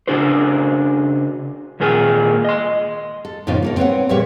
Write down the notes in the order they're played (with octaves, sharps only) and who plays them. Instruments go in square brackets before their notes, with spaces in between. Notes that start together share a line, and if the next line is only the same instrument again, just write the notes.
[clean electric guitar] C#3 D4 F#4 A#4 C5
D#2 A#2 A#3 G#4 A#4
D#5 C6
[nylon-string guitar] A4
F2 A2 C#3 B3 D#4 F4
A#3 A4 A#4
C4 B4 C#5 F#5
E2 A#2 G3 C#5 E5